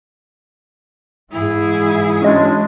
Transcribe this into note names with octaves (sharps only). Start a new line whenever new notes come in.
G#2 E3 E4 G#4
F#3 G#3 C#4 D4 D#5